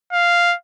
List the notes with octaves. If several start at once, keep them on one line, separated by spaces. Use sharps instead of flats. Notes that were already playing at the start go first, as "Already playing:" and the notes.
F5